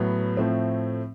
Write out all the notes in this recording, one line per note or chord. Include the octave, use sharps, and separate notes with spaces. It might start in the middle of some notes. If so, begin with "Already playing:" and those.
Already playing: A2 F#3 B3
A2 F3 A3 C4